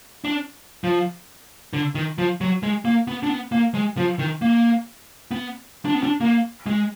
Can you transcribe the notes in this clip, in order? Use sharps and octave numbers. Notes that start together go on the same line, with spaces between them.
D4
F3
D3
D#3
F3
F#3
G#3
A#3
B3
D4
B3
A#3
G#3
F3
D#3
A#3
B3
D4
B3
D4
A#3
G#3